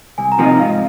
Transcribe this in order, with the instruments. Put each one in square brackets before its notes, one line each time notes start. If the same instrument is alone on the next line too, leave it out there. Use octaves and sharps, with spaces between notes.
[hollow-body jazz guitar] C2 [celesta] G#5
[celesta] A#5
[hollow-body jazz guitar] C3 F3 A#3 D#4
[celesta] D#5
[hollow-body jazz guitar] G#2 [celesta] F5